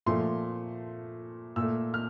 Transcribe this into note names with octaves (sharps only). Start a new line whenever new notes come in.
A#2 F3 A3 C6
A#2 A3 E6
F6